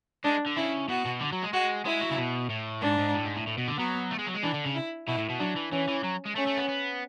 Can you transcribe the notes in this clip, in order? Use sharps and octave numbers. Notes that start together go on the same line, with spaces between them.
G#3 D4
D3
C#3 E4
B2 F#4
B2
D3
F#3
G#3
G#3 F#4
G#3 E4
F#3
C#3
B2
A2
G#2 D4
G#2
A2
G#2
A2
A2
B2
D3
F#3 B3
A3
G#3
F#3
G#3
E3 D4
D3
C#3
E4
B2 E4
A2
B2
F#3 D4
E3
E3 C#4
E3
F#3
G#3
A3 C#4
A3
B3
B3